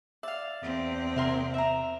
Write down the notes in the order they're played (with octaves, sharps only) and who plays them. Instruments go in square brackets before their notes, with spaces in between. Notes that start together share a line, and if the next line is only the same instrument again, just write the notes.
[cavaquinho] D5 F5 [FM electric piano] E5
[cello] E2 C4
[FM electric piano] C3 [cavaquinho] E4 A#4 C6
[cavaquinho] E5 A#5